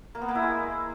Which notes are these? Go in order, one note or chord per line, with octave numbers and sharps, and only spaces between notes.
A#3
B3
A#3
E4
G#3